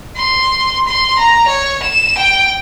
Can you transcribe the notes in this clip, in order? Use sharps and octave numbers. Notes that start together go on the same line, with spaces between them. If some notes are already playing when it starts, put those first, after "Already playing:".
C6
C6
A#5
C#5
E7
G5